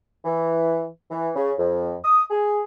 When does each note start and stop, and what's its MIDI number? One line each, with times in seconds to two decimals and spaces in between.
0.25 0.86 52
1.10 1.29 52
1.35 1.52 49
1.57 1.94 41
2.03 2.23 87
2.30 2.61 68